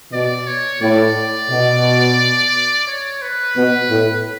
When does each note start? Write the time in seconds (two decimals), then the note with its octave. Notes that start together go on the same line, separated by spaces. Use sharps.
0.12 B2 D5
0.47 C#5
0.81 A2 D5
1.50 B2
2.87 C#5
3.22 B4
3.57 B2
3.90 A2